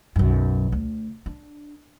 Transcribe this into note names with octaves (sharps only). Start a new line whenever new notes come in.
B1 F#2
D2
D4